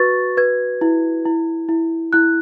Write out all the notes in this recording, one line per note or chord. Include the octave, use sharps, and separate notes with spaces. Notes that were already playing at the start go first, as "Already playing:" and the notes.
Already playing: F#4 B4 C#6 A6
B4 G#6
E4
E4
E4
E4 F#6